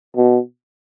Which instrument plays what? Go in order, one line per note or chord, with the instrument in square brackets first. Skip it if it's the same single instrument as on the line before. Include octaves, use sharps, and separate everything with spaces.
[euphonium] B2